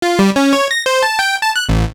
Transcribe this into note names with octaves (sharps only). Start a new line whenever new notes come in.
F4
G3
C#4
C#5
A#6
C5
A5
G5
A5
F#6
A1